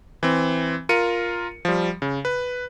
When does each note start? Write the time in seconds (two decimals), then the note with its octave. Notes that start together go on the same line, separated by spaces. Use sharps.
0.23 E3 C4
0.89 F4 A#4 C#7 D#7
1.65 F3 G3
2.02 C#3
2.25 B4